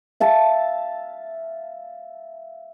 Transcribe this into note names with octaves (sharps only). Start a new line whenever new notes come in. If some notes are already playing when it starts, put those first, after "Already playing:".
E5 F5 A5